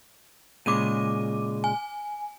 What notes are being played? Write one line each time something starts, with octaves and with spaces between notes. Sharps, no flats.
A#2 C#3 G#3 D6 D#7
G#5